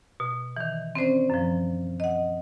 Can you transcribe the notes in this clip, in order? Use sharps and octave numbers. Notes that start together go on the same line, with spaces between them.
B2
D#3 E3
C4 C#4 C5 D5
F#2 F3
D#5 F#5